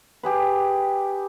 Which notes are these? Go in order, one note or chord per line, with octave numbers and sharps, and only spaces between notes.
G4 G#4 B4